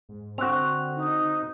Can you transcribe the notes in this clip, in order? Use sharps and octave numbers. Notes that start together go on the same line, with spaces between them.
G#2
D3 C4 F#4 F#6 F7
D#4